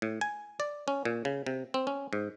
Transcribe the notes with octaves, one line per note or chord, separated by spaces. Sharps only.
A2
G#5
D5
C#4
A#2
C#3
C3
C4
C#4
G#2